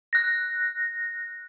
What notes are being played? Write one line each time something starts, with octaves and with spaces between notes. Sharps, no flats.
F#6 A#6